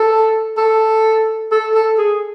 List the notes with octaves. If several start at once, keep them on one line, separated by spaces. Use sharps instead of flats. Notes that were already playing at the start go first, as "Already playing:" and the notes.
Already playing: A4
A4
A4
A4
G#4